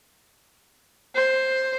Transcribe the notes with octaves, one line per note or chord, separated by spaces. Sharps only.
C5